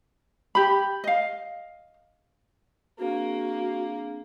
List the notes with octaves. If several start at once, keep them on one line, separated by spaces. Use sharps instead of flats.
G4 B5
D#5 F5
A#3 C4 D4 F#4 G#4